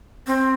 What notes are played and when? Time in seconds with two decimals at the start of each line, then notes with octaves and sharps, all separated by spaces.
0.27 C4